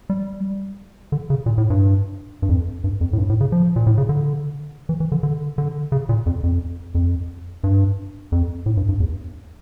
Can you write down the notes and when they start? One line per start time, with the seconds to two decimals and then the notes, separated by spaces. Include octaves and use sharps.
0.10 G3
1.12 D3
1.30 C#3
1.46 A#2
1.58 A2
1.70 G2
2.42 G2
2.49 F2
2.84 G2
3.01 F2
3.13 A2
3.18 G2
3.29 A2
3.41 C#3
3.52 F3
3.76 A#2
3.86 A2
3.98 C#3
4.09 D3
4.89 E3
5.00 E3
5.12 D3
5.23 D3
5.58 D3
5.92 C#3
6.09 A#2
6.26 F2
6.43 F2
6.95 F2
7.64 G2
8.32 F2
8.66 A2
8.77 G2
8.89 G2
9.00 E2